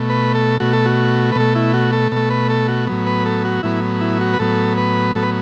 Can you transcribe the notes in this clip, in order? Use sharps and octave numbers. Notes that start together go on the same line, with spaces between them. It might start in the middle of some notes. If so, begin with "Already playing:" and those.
Already playing: B2 A3
B4
A4
B2 A3 F#4
A4
F#4
B4
B2 A3 A4
E4
F#4
A4
B2 A3 A4
B4
A4
F#4
A2 F#3 B3
B4
A4
F#4
A2 F#3 B3 E4
E4
F#4
B4
A2 F#3 B3 A4
B4
A2 F#3 B3 A4
B4